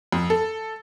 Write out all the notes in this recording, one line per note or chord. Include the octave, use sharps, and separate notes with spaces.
F2
A4